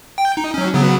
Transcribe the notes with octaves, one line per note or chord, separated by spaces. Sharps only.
G5
D#4
F#3 C#4
C#3 F#3 B3